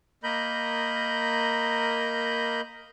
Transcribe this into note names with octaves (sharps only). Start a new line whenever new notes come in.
A#3 A#4 D#5 B5 G6